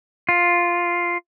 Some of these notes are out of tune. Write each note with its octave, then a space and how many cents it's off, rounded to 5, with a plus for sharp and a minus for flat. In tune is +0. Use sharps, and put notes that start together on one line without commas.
F4 +0